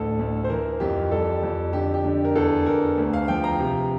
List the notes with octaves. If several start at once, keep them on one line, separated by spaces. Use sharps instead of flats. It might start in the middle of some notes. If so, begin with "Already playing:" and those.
Already playing: A1 D2 A4
D2
C5
E3 A#4
F2 G4
G3 A4
F2
D3 G4
G4
D3
A#4
E2 A4
E2 A#4
D2
F5
F3 G5
A#5
C3